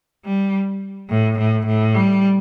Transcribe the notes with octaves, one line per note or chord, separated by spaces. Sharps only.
G3
A2
A2
A2
G3